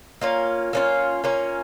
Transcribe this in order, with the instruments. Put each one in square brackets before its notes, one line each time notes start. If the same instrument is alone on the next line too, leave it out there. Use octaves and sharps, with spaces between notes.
[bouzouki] A#3 C#4 F4
A#3 C#4 F4
A#3 C#4 F4